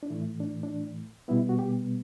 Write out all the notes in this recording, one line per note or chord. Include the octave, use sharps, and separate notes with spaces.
D4
A2 E3 A3 E4
D4
D4
B2 G3 B3 E4
F#4
G4